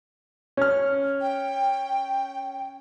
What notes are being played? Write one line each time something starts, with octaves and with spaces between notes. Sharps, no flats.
C#4 F6
G5